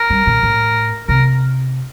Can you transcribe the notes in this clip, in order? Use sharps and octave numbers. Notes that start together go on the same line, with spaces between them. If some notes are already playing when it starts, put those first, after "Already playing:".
Already playing: A#4
G3
A#2
A2
C3 A#4